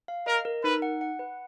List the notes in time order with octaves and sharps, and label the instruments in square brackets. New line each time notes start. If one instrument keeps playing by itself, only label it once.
[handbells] F5
[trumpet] A#4 [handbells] D#5
[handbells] A#4
[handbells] D#4 [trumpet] B4
[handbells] F#5
F#5
B4